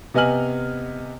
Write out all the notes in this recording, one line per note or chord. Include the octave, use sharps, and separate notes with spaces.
C3 B3 D#5 G#5 F6 F#7